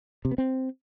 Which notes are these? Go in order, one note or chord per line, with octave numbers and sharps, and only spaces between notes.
C3
B3
C4